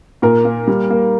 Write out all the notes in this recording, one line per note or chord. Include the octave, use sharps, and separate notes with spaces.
A#2 A#4
A#3
G3
A#3